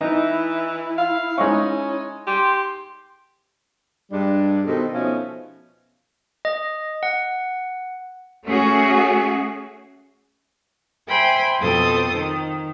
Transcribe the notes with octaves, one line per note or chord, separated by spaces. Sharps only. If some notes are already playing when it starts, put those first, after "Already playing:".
E3 D#4 E4
F5
G#3 C#4 D#4 C#6
G4 C6
G2 G3 G#3 D4
B2 D#3 C4 D#4 A4
B2 F3 A3 C#4 D#4
D#5
F#5
A3 C#4 F#4 G#4
C5 E5 G5 G#5 B5 C6
F2 B2 C4 A4 C5 D#6
D#3